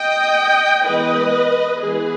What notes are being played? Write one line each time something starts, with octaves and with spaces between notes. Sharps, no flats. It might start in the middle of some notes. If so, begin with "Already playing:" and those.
Already playing: D#5 G5
E3 G#3 B3 B4 D#5
E3 G#3 B3 G#4 B4